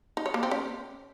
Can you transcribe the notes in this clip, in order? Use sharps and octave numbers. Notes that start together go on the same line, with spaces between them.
D#4
C#5
A#3
C4
C#4